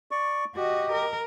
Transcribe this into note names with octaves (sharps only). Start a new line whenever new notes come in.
D5 C#6
F#4 G4 D#5
A#4